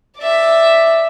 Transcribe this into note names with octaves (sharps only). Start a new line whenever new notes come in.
D5 E5